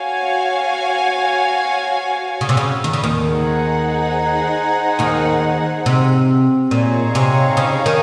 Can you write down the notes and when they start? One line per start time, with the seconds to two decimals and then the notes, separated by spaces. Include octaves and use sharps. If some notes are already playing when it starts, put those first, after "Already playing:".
Already playing: F#4 C#5 F5 G#5
2.41 C#3
2.49 C3
2.57 C#3
2.84 D#3
2.93 C#3
3.04 D#2 D#3
3.27 D#4 G#4 C5 F#5
4.99 D#2 D#3
5.86 C3
6.71 A#2 D#4 G#4 C#5 F5
7.15 C3
7.57 C#3
7.86 D#3